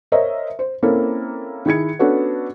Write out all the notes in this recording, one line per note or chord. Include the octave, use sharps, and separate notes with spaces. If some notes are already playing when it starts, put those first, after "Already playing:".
A#4 C5 C#5 D#5 E5
C5
A#3 C4 C#4 E4 A4 A#4
D#3 E4 G#4 G#6 C#7
B3 C#4 D4 F#4 A4